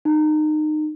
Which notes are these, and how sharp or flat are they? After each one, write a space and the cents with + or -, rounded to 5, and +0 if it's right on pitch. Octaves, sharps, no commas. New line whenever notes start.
D#4 -25